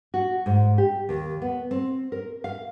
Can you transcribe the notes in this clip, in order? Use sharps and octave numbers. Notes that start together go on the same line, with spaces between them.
F#4
G#2
G4
D#2
B3
C4
A#4
F5